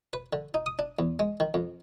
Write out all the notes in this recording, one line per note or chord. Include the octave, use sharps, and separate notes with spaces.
B4
D3
D#4
D#6
D4
E2
G#3
D#3
F2